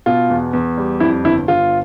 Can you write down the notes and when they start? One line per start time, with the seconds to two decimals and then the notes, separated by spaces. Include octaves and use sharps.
0.06 B2 F4
0.30 E2
0.53 E2
0.77 G3
1.00 F2 E4
1.24 G1 E4
1.48 G1 F4